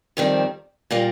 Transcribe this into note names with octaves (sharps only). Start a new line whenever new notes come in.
F2 D#3 G3 C4
A#2 G3 A#3